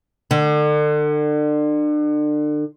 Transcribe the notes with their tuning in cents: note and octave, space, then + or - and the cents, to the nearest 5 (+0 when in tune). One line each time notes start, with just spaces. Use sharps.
D3 +35